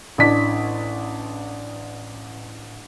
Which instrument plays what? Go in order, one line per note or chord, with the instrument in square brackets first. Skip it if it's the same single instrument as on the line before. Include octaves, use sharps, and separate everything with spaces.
[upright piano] A1 D4 B6